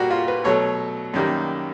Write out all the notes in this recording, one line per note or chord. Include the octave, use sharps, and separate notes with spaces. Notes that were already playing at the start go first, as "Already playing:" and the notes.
Already playing: A#2 G3 A#3 F#4
F4
B4
B2 F#3 A3 C#5
F#2 D#3 G3 A#3